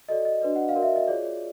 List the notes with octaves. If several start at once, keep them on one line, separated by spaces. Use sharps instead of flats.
F#4 A4 D5 D#5
D#5
D4 F#4 B4 D5
F#5
F5
F#4 A#4 D5
E5
D#5
F4 G#4 C#5 D5